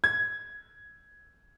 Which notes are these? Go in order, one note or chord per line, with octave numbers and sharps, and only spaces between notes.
G#6